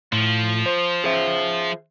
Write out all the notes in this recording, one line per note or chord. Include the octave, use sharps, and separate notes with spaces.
A2 F3
C5
G#4 C5 E5